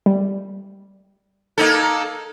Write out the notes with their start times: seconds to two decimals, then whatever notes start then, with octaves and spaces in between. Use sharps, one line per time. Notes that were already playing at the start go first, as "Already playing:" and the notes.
0.06 G3
1.58 A#3 D#4 A4